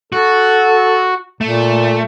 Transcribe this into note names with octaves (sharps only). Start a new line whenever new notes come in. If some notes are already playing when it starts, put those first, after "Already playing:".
F#4 A4
A#2 A3